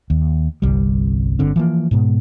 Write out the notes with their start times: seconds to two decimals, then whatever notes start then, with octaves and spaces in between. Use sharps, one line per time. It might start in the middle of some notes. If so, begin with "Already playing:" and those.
0.10 D#2
0.62 G1 C2 G3
1.39 G1 D3 C4
1.56 E3 F3 A#3
1.91 G#2 B2